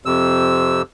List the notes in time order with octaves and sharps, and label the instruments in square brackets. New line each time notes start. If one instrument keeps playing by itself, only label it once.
[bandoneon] F2 C3 E6